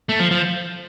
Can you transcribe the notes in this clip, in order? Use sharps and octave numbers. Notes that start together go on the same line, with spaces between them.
A3
F3
F3